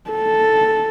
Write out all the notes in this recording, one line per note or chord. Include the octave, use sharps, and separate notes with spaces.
A4